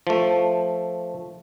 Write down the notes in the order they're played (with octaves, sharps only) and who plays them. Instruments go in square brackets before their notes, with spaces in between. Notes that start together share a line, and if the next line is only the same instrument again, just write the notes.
[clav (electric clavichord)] F3 A3